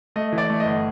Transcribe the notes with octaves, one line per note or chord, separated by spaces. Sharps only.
A3 D#5
E3
D5
A3
D#5
G1